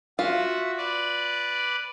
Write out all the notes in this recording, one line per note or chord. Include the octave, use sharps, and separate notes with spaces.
F4 F#4 E5
B4 D5